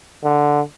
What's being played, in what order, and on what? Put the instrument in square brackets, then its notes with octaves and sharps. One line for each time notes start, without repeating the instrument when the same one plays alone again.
[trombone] D3